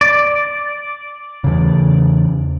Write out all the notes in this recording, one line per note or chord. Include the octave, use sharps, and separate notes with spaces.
D5
E2 C#3